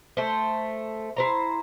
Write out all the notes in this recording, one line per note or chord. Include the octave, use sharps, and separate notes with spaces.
A3 C5
E4 C5 A#5